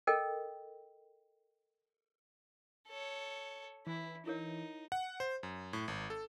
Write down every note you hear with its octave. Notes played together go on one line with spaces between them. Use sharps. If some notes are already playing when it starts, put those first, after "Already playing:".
A4 A#4 D#5 G5
A4 C#5
E3 E4
D#4 E4 A#4 C#5
F#5
C5
F#2
A2
G#1
A4